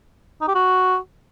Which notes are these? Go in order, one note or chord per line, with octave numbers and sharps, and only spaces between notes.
D#4
G4
F#4